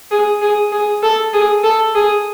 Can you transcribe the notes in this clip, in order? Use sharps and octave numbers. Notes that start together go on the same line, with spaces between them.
G#4
G#4
G#4
A4
G#4
A4
G#4